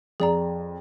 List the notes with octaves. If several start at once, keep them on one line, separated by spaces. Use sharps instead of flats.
F2 G#4 D5 A#5